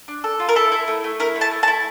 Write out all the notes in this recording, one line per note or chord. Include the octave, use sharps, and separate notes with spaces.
D4
A4
F4
A#4
E4 A4
E4
A3
A3
E4 A#4
A3
A5
A3
A5
E4